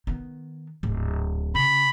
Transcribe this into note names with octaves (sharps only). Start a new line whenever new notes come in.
D#3 B3
D1 G#2
C#3 B5